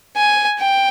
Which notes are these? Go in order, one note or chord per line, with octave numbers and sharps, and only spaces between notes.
G#5
G5